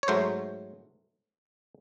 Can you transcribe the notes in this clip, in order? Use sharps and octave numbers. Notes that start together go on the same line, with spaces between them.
C#5
G#2 F#3 A3 C5